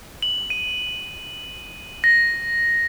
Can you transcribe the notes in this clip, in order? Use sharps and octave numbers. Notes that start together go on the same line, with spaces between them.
F#7
D#7
A#6